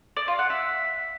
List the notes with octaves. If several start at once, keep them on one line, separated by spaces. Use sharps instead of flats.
D5
F4
F#5
E5